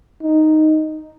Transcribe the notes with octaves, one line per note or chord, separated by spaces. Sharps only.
D#4